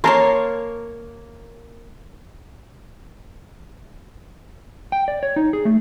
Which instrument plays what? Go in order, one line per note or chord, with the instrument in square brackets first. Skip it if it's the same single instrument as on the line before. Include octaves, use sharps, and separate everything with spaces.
[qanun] A#3 A#4 C#5 [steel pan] A5 A#5 C6
[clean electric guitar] G5
D5
C#5
D#4
G#4
A3